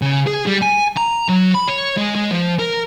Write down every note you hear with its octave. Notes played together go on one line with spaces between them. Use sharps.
C#3
G#4
G3
G#5
A#5
F#3
B5
C#5
G#3
G#3
F3
A#4